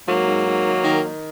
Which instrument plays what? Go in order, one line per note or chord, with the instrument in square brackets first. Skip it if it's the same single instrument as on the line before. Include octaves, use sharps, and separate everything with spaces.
[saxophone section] G#2 F#3 A#3
G#2
G#2
D#3
D#3
D#3